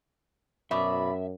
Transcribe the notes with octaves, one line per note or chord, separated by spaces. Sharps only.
F#2 B2 D5 E5 B5